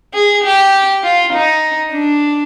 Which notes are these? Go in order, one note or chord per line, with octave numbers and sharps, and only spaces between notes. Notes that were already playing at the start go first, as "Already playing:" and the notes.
G#4
G4
F4
D#4
D4